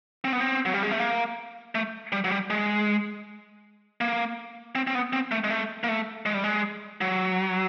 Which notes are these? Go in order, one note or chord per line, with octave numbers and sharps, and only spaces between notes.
C4
B3
C4
F#3
G3
G#3
A3
A#3
A3
G3
F#3
G3
G#3
A#3
C4
C4
B3
C4
A3
G#3
A3
A#3
A3
G#3
G3
G#3
F#3